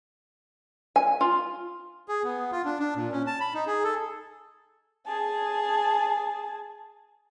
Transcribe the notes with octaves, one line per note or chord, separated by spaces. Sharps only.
G#5
F4
G#4
B3
F4
D4
D4
A#2
C#4
A5
B5
D#4
G#4
A4
G#4 A5